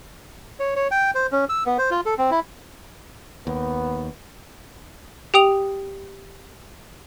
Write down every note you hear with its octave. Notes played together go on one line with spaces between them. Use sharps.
C#5
C#5
G5
C5
C#4
E6
B3
C5
F4
A4
C4
E4
D#2 B3
G4 G5 D#6 F7